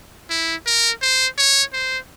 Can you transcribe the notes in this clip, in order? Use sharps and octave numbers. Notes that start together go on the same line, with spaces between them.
E4
A#4
C5
C#5
C5